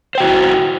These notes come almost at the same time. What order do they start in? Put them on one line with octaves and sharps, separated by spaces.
C5 G5 F#4 E4